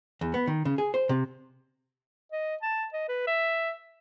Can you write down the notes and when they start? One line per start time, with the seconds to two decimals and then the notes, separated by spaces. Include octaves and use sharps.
0.21 E2
0.34 B3
0.47 D#3
0.65 C#3
0.78 G#4
0.94 C5
1.09 C3
2.32 D#5
2.62 A5
2.93 D#5
3.08 B4
3.27 E5